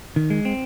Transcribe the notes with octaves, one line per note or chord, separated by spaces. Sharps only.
D#3
G#3
C4